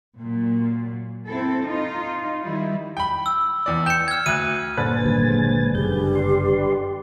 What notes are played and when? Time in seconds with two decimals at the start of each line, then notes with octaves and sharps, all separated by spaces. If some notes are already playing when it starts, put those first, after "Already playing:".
0.18 A#2 F#3
1.26 C4 E4 A4
1.63 D#4 F4
2.39 D#3 G3 D#4 E4
2.97 G5 B5
3.26 E6
3.66 E2 D5
3.86 G5 G6 C#7 E7
4.08 F6 G#6
4.26 D2 F#6 D#7
4.77 G1 A#2 D3 B4 C5 G#5 A6
5.06 G#2 D#3 G3
5.28 F#3 G#3
5.75 F#2 C#3 G3 G#4 G6
6.15 G4 D5 C6